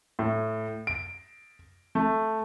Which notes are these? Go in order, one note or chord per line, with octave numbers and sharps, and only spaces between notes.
A2
D7
A3